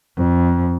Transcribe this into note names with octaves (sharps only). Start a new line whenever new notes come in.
F2